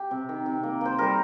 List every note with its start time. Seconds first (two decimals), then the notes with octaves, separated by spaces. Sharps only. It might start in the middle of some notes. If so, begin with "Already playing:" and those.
Already playing: G4
0.11 C3
0.29 D#3
0.46 C3
0.63 A#3
0.81 A#3 C5
0.98 G3 A#4